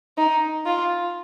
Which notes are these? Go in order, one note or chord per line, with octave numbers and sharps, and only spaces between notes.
D#4
F4